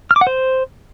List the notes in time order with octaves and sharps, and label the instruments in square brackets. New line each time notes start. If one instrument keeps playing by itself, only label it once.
[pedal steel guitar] F6
D6
F#5
C5